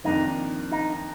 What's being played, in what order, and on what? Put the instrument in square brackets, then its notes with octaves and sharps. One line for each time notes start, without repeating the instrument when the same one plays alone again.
[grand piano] F2 D#3 A#3 D4 [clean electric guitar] D#4
[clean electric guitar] D#4